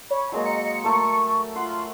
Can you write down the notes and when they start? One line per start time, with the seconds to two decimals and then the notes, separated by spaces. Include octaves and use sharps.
0.11 C#5 B5
0.32 F#3 G#3 A#3 D#5
0.46 C#7
0.84 A3 A4 A#4 C#6
1.56 F4 F#5 C6